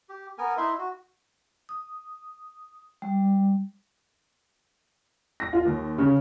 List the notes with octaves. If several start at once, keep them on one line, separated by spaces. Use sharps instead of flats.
G4
B3 A#4 G#5
D#4 E4 E5 C6
F#4
D#6
G3
A#6
F4
D#2
C#3